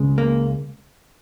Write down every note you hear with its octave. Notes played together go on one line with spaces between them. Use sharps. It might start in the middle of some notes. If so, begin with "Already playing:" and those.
Already playing: C#2 C#3 G#3
A#3